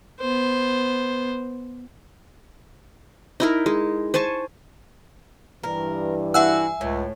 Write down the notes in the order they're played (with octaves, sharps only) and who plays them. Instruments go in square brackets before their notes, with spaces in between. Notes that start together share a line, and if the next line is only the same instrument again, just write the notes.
[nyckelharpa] B3 C5
[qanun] D#4 E4 A#4
G#3
C5 G#5 A5 C#6
[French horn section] G2 E3 [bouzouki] A#4
[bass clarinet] E4 [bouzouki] F#4 F#5 [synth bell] E5 G#5 E6
[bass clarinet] C#2 [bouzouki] A2